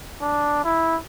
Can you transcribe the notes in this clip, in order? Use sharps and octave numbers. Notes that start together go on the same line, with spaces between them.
D4
E4